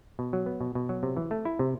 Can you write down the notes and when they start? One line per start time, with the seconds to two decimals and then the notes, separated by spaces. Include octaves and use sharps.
0.19 B2
0.33 F#3
0.46 B3
0.61 B2
0.75 B2
0.89 F#3
1.03 C3
1.17 E3
1.31 A3
1.45 E4
1.59 C3